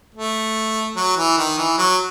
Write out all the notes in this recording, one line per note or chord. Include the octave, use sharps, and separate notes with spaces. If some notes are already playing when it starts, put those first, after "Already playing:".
A3
F#3
E3
D#3
E3
F#3